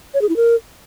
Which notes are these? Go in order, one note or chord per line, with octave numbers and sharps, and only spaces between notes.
C#5
G#4
E4
A#4